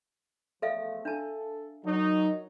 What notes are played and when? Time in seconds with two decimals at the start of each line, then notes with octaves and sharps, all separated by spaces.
0.62 E2 F3 A3 A4 E5 F5
1.05 D4 A4 A5
1.84 F#3 D#4 F#4 A#4 C#5